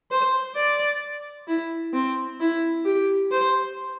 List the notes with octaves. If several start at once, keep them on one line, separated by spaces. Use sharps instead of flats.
C5
D5
E4
C4
E4
G4
C5